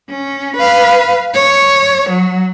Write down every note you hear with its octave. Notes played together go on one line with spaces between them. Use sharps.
C#4
B4 F5
C#5
F#3